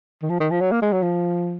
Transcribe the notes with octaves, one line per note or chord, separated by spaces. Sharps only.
D#3
F3
D#3
F3
F#3
A#3
G#3
F#3
F3